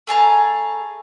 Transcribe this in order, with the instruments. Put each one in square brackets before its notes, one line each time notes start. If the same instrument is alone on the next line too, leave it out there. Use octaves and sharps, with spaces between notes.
[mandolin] A3 G#4 A5 A#5